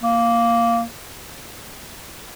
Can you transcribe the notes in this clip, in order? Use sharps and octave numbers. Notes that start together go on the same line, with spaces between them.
A#3